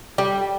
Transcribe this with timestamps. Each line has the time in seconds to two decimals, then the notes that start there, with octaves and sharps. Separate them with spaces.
0.18 G3